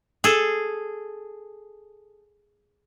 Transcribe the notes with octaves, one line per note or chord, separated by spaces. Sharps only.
G#4 A4